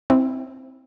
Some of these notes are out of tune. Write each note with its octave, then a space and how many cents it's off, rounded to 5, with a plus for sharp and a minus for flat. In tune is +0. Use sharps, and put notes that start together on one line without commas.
C4 +0 E4 -20